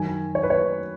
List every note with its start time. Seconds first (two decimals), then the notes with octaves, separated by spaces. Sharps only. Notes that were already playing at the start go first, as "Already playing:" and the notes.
Already playing: F#2 D#3 G#5
0.35 C#5
0.43 B4
0.50 C#5